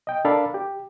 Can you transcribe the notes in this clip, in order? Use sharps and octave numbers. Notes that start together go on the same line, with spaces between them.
D#5 G5
D4 A4 A#4 D5 F5 B5
G4